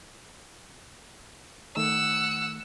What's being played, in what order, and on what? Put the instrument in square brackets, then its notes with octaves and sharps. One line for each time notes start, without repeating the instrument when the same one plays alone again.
[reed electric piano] D#3 A3 [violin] F#5 E6